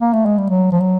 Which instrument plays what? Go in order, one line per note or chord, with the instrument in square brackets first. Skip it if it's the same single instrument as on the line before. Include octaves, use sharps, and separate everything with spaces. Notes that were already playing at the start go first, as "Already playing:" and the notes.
[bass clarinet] A#3
A3
G#3
G3
F#3
F3
F#3